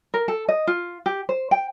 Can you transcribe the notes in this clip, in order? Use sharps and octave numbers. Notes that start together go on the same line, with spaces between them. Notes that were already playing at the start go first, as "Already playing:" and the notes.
A#4
A4
D#5
F4
G4
C5
G5